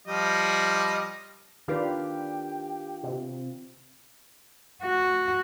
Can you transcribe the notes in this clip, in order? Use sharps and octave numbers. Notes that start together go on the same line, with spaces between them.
F3 G3 D#5
D#3 D4 F4 G4 A#4 B4 F5
C3
F#4